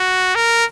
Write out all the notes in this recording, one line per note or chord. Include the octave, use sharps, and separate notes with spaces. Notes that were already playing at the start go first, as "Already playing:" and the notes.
Already playing: F#4
A#4